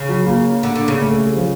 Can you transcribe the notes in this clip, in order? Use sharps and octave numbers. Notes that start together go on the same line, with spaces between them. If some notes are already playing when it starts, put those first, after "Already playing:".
Already playing: C#3
F#3
A#3
D3
D3
C#3
A3
A3
G3
F3